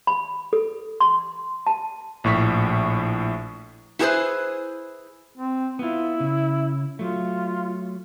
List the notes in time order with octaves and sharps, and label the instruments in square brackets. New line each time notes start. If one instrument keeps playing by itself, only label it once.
[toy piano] B5
A4
C6
A5
[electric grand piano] A#1 A2 C#6 B6
[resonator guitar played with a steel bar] E4 F#4 G#4 A4 B4 C5
[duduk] C4
[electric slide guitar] B3 F4 [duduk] E4
[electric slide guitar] C#3
[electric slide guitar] F#3 A3 [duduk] F4